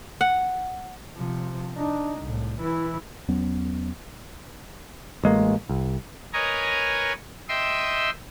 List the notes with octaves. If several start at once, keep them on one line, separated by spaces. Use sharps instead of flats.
F#5
C3 F3
D4 D#4
C2 A2
E3 E4
E2 F#3 B3 C#4
A1 G#3 A#3
C2
A#4 B4 C#5 D#5 G#5 A#5
D#5 E5 G5 C6 E6